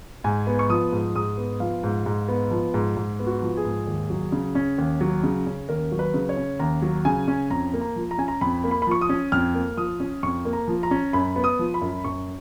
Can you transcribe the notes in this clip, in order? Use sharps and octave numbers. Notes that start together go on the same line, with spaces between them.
G#2 G#5
B3
C#6
F3 D#6
G#2
G#2 D#6
B3
F3 F5
G#2
G#2
B3
F3
G#2
G#2
B3
F#4
F3
G#4
G#2
D#2
F#3
C#3
C#4
D#2
F#3
C#3
C#4
D#2 A#4
F#3
B4
C#3
C#5
C#4
D#2 A#5
F#3
C#3 G#5
C#4
F2 A#5
A#3
A#5
F3
A#5
C#4 G#5
A#5
F2 B5
A#3
B5
B5
F3 C#6
D#6
C#4
F2 F6
A#3
F3 D#6
C#4
F2 C#6
A#3
A#5
F3
A#5
C#4
F#2 B5
B3
D#6
F3
B5
F#2
F#2 C#6